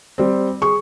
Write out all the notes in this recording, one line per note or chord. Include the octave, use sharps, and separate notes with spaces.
G3 C4
G#4 C#6